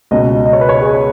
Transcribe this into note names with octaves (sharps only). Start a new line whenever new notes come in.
C#2 B2 D#5
D#5
C#5
B4
C#5
G#4